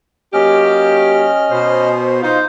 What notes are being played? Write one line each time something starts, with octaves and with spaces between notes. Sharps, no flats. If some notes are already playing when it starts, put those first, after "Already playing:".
F#3 A#3 C#4 G4 D#5 F6
B2 C5
D#4 F4 C5